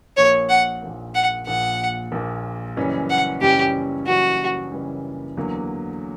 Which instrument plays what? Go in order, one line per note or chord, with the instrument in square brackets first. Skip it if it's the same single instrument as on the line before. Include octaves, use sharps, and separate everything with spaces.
[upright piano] A#1 A#2 A#3 [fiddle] C#5
[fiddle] F#5
[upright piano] A#1 A#2 A#3
[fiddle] F#5
[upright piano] A#1 A#2 A#3 [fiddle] F#5
[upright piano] A#1 A#2 A#3
F#1 F#2 E3 G3 C#4
[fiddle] F#5
[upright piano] F#1 F#2 E3 G3 C#4 [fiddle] G4
[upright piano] F#1 F#2 E3 G3 C#4 [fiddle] F#4
[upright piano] F#1 F#2 E3 G3 C#4
E2 D3 F#3 A#3